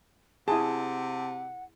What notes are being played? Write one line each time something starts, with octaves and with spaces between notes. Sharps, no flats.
C3 E4 G#4 F#5 A5